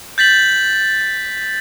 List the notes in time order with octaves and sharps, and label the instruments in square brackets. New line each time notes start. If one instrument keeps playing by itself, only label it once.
[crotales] G6 A6 B6 F#7